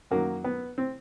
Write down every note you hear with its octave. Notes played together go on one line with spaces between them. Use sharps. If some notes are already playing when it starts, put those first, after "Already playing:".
F#2 D#3 F#3 A#3
B3
C4